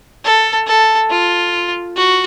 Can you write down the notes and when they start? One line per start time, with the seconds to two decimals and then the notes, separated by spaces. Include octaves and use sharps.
0.25 A4
0.67 A4
1.10 F4
1.96 F#4